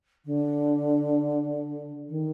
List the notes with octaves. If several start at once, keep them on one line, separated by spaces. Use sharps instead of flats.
D3
D#3